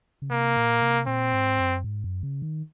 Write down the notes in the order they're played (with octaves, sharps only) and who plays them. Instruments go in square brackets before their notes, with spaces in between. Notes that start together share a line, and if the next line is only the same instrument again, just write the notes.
[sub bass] C#3
[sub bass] C3 [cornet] A#3
[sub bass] A#2
C3
[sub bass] A#2 [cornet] C4
[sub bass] G#2
F#2
G#2
F#2
C#3
D#3